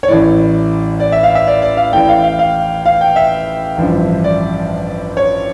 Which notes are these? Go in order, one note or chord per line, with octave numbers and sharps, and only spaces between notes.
C#5
A1 A2 E3 D5
D5
E5
F5
E5
D5
D5
F5
A1 A2 E3 G5
F5
F5
F5
F5
G5
E5
A1 G2 F3
D5
C#5